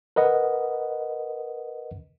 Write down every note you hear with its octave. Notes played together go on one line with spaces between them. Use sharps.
A#4 B4 D#5 F#5